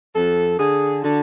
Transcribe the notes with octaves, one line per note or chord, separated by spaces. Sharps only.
F2 A4
D3 G#4
D3 F#4